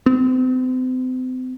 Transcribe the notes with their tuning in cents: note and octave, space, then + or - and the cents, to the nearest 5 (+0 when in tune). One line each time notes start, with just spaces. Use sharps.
C4 -40